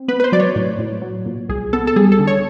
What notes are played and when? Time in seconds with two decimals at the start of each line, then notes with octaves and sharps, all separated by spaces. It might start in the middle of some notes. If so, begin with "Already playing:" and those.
Already playing: C4
0.08 B3 B4
0.20 B4
0.24 C5
0.32 F#3 D5
0.40 C#5
0.56 A2
0.79 A2
1.02 F#3
1.26 A#2
1.49 C2 G#4
1.73 B3 A4
1.87 A4
1.96 G3 G#4
2.12 A4
2.19 D3
2.27 C#5